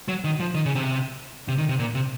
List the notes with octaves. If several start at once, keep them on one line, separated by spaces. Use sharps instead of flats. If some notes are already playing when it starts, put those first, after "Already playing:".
F#3
D#3
F3
D#3
C#3
C3
C3
D#3
C3
A#2
C3